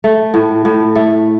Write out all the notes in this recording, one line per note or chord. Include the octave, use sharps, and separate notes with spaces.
A3
A2
A2
A3